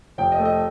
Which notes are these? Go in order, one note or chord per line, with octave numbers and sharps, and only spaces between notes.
F1 G5
D#5
A3
D#5